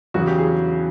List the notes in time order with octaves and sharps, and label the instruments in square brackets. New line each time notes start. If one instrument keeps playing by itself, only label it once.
[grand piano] E2 C#3 F#3 [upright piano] F#4
[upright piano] G4
G#4